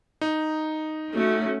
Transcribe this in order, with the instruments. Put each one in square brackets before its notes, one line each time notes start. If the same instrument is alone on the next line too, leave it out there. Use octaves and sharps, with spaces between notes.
[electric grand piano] D#4
[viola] A3 [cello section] C#4 F#4